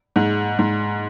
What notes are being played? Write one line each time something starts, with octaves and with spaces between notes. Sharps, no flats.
G#2
G#2